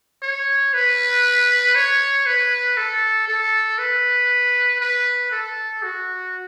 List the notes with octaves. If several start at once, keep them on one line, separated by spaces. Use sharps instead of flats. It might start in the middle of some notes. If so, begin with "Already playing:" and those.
C#5
B4
C#5
B4
A4
A4
B4
B4
A4
F#4